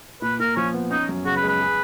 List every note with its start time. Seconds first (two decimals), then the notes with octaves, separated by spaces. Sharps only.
0.22 A#2 B4
0.40 A#2 A#4
0.56 F3 C#4
0.74 B3
0.90 C#4 D#4
1.09 F#2
1.25 C#3 F#4
1.36 B4
1.43 G#3
1.49 B4
1.60 G#4